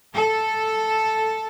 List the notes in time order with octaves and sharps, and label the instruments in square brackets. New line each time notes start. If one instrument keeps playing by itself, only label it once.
[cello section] A4